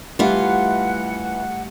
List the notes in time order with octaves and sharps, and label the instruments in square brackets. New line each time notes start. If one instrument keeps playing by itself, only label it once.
[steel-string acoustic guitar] E3 F4 [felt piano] G3 A3 [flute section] F#5